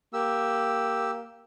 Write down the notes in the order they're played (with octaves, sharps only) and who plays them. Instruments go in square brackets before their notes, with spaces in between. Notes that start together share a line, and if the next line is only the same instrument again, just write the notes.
[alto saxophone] A#3 [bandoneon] G4 E6